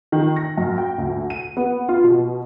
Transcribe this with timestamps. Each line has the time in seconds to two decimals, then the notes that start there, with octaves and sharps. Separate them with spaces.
0.12 D#3
0.36 A#6
0.57 F#2
0.78 G5
0.98 D2
1.30 D#7
1.57 B3
1.89 F4
2.04 B2